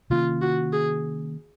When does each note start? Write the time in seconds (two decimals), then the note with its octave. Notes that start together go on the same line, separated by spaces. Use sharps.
0.10 C3 D#3 A#3 C#4 F4
0.42 F#4
0.73 G#4